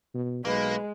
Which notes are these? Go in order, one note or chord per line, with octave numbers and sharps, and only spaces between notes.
B2
B1 G#3 A#3 B4